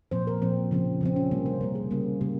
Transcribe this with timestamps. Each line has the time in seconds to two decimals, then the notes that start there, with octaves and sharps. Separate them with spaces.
0.11 A#2 F3 C4 C5
0.27 A#4
0.42 A#2 F3 C4
0.71 C#3 F3 C4
1.01 C#3 F3 C4
1.16 C#4
1.31 C3 G3 A#3
1.46 C5
1.61 C3 G3 A#3 A#4
1.75 G#4
1.91 C#3 G3 A#3
2.21 C#3 G3 A#3 G4